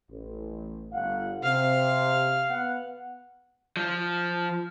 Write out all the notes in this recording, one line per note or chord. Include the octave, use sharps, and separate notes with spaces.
A1
G1 F5 F#5
C3 F5
B3 F#5
F3